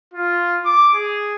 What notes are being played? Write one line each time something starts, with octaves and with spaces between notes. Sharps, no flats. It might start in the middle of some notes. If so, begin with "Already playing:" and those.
F4
D6
G#4